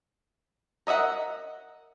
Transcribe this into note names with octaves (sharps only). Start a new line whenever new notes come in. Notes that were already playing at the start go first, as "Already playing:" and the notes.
A#4 D#5 E5 F#5